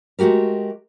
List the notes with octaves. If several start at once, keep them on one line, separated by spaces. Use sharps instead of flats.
G#3 A3 F#4 G4 A#4